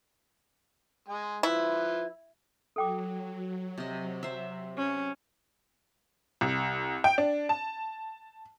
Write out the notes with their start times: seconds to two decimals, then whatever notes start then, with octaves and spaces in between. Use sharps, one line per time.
1.08 G#3 G#5
1.43 F3 E4 B4
2.76 F#3 A4 G5 D6
3.78 C3 D#5
4.23 C5 E5
4.77 C#4
6.41 C2
7.04 G5
7.18 D4
7.49 A5